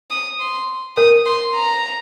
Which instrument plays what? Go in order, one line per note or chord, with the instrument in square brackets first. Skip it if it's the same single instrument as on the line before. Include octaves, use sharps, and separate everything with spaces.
[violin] D#6
C6
[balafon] A#4 [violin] D#6
[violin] C6
A#5